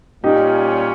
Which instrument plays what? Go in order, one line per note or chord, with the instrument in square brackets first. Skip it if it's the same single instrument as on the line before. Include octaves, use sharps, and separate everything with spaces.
[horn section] A#2 G3 C#4 F4 [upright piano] D#4 G4